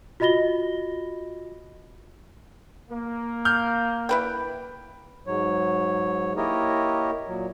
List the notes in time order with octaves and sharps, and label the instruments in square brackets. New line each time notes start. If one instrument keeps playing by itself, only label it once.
[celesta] F4 F#4 D#5 B5 A#6 G7
[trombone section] A#3
[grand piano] F6 G6
[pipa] E4 B4 G5
[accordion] G#2 F#3 C#5
A#3 E4 G4 A#4 C#5 D#5
A#2 F#3